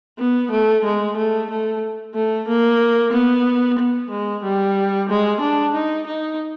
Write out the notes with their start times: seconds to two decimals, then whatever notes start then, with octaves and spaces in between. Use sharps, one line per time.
0.18 B3
0.51 A3
0.84 G#3
1.17 A3
1.50 A3
2.14 A3
2.48 A#3
3.12 B3
3.78 B3
4.10 G#3
4.43 G3
5.09 G#3
5.40 D4
5.74 D#4
6.07 D#4